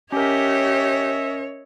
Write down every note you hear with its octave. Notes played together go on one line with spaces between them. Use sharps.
C#4 G4 A#4 C#5 D#5 E5